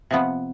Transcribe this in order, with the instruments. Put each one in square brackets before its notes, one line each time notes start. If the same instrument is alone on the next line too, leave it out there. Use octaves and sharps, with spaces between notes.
[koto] C3 F3 B3